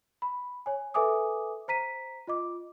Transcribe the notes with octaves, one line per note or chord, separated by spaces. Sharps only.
B5
C#5 G#5
A4 B4 E5 G#5 D6 D#6
C5 A#5 B6 D#7
F4 D#5 D6